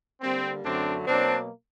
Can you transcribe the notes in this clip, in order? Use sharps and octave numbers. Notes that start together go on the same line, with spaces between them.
D3 G3 A#3 C4
F#2 D3 F#3 A3 C4 D4
B2 F#3 A#3 C4 D4